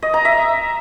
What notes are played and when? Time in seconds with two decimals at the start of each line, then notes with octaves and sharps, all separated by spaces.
0.02 D#5
0.14 A#5
0.25 E5